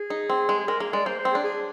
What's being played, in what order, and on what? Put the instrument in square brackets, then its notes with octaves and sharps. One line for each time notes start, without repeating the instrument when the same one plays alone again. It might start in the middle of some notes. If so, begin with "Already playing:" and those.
Already playing: [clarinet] G#4
[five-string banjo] D#4
C4
G#3
[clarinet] G#4
[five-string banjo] G#3 [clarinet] A#4
[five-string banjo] A#3 [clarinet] G#4
[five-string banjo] G#3 [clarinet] D5
[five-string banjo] A#3 [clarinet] C5
[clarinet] C5
[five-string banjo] C4
[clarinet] G#4
[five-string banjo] D4
[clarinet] G#4